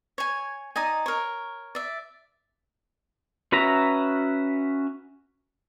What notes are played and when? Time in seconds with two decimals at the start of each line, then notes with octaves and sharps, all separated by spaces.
0.18 C#5 G#5
0.76 D#4 D5 D#5 G#5
1.06 A#4 C#5
1.75 D5 E5
3.52 C#4 F#4 B4 E5 A#5